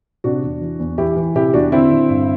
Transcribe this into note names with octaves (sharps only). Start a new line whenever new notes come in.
C3 D4 F#4
E2
E3
E2
E3 E4 G4
E3
C3 E4 G4
E2 D4 F#4
D3 C4 E4
D3
G2